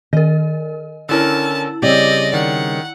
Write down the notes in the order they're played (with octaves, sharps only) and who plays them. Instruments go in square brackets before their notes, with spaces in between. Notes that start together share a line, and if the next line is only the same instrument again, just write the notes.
[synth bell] D#3 A#4 [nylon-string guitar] D#5
[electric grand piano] D3 C#4 A#4 [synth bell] E4 E6 [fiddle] A5
[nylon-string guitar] C#3 G3 C4 [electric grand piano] G4 [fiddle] D5 D#5
[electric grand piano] D#3 [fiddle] F#5